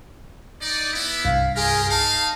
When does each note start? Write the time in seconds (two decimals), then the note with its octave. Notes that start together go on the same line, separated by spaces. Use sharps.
0.62 D#4 D5
0.94 B3 E4
1.25 C2 G2 F5
1.56 F4 G4 G#4 A#4
1.90 D#4 F5 A5